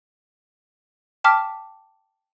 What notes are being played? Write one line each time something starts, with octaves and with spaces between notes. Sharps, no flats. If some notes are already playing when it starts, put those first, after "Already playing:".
G5 A5 D6 F6 B6